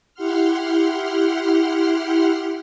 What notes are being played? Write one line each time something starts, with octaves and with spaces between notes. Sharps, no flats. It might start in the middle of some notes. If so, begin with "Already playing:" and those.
E4 G4 F#5 C6 F6